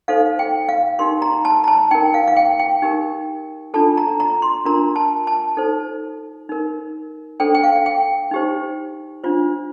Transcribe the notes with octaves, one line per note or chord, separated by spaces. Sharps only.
D#4 A4 C5 F5
G5
F5
D#4 G4 A#4 C6
A#5
A5
A#5
A5
D#4 A#4 G5
F5
F5
G5
G5
D#4 G4 A#4
D4 F4 A4 A5
A#5
A#5
C6
D4 F4 A#4 A#5
A5
A5
D#4 A4 C5
D#4 A#4
D4 A4 C5 G5
G5
F5
G5
D#4 G4 C5
D4 F4 C5